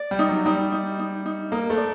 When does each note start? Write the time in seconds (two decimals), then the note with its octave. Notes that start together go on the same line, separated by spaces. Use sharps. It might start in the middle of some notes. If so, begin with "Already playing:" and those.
Already playing: D5
0.11 G3
0.19 D#4
0.29 F#3
0.46 G3 D#4
0.72 D#4
1.00 D#4
1.26 D#4
1.52 A#3 D#4
1.70 A3
1.78 D5